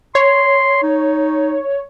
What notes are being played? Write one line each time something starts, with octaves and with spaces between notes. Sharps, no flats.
C#5 C6
D#4